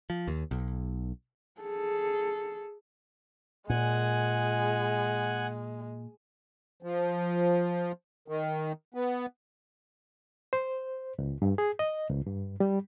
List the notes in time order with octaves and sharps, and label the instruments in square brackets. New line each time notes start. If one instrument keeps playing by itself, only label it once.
[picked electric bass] F3
D#2
B1
[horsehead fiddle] G#4 A4
[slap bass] A#2 [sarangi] G#3 [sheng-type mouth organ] F#5 G#5
[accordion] F3
D#3
B3
[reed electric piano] C5
C#2
G2
G#4
D#5
C#2
G2
G3